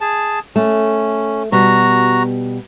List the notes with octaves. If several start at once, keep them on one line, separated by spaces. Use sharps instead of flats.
G#4 A5
A3 C#4
B2 G3 F#4 A#5